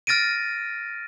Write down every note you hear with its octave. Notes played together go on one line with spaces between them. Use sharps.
F6 A6 A#6 D7 D#7